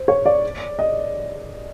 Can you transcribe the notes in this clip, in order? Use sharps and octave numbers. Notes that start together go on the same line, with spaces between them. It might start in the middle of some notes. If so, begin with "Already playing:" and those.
Already playing: C5
C#5
D5
D#5